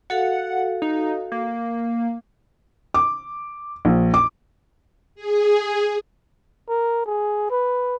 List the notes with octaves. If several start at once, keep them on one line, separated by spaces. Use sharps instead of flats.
F#4 A4 F5 F#5
D#4
A#3
D6
A#1
D6
G#4
A#4
G#4
B4